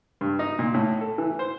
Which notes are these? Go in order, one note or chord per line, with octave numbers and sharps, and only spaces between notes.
G2
D#4
A#2
A2
A4
E3
C5